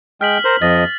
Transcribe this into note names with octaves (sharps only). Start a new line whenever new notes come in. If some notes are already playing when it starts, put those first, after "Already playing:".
G#3 G5 F6 B6 F#7
A#4 C5
F2 F3 D#5 A6